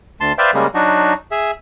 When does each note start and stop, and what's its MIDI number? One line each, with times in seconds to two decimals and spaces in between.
0.21 0.32 38
0.21 0.32 81
0.21 0.32 84
0.38 0.51 71
0.38 0.51 72
0.38 0.51 74
0.38 0.51 76
0.38 0.51 77
0.38 0.51 79
0.54 0.67 49
0.54 0.67 55
0.54 0.67 56
0.54 0.67 58
0.74 1.13 54
0.74 1.13 62
0.74 1.13 63
0.74 1.13 66
1.31 1.51 68
1.31 1.51 76